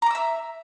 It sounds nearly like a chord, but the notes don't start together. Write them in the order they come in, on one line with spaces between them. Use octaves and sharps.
A#5 D6 E6 E5